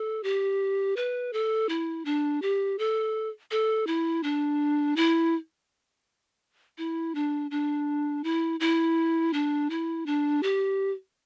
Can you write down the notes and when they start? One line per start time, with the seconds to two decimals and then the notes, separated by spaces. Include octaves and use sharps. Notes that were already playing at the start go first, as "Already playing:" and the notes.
Already playing: A4
0.24 G4
0.96 B4
1.33 A4
1.69 E4
2.05 D4
2.42 G4
2.79 A4
3.51 A4
3.87 E4
4.23 D4
4.96 E4
6.78 E4
7.15 D4
7.51 D4
8.24 E4
8.60 E4
9.33 D4
9.70 E4
10.06 D4
10.43 G4